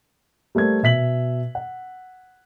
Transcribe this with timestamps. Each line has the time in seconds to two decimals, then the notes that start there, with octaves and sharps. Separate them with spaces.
0.55 G3 A3 A#4 C5 G#6
0.83 B2 E5 B6 F#7
1.55 F#5